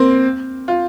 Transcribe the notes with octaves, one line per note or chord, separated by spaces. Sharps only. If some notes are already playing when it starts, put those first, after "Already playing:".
Already playing: A#3 C4
F4